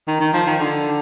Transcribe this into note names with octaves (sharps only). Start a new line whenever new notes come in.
D#3
D#3
F3
D#3
D3